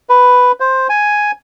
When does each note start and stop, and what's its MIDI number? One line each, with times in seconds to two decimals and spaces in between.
0.09 0.52 71
0.60 0.87 72
0.89 1.31 80